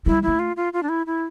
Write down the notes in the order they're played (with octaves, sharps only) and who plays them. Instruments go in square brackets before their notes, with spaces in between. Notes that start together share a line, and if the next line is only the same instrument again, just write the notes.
[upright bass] G3 [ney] E4
[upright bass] A3 [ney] E4
[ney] F4
F4
F4
D4
E4
E4